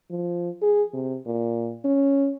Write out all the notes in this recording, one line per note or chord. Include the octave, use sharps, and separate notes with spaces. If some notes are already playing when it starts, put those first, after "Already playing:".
F3
G#4
C3
A#2
C#4